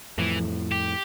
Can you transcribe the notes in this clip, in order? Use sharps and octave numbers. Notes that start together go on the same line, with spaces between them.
F2 A2 E3
G4